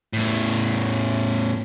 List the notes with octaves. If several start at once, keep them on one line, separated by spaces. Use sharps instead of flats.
E2 A2